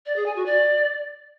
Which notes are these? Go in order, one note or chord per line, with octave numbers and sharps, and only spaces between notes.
D5
G#4
G#5
F#4
D5